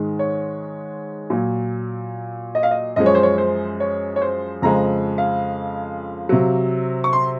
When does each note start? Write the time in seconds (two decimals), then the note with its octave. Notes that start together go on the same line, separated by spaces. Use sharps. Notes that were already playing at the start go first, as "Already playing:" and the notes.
Already playing: G#2 D#3 G#3
0.19 C#5
1.30 A#2 F#3
2.55 D#5
2.63 F5
2.71 D#5
2.96 F#2 F3 G#3 D#5
3.06 C#5
3.15 C5
3.23 C#5
3.38 C5
3.80 C#5
4.16 C#5
4.22 C5
4.62 F2 C#3 F3 G#3 A#5
5.18 F5
6.29 C3 F#3
7.04 C#6
7.13 C6